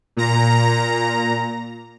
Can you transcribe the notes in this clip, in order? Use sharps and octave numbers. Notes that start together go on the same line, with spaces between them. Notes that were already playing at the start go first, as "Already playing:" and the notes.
A#2 A#5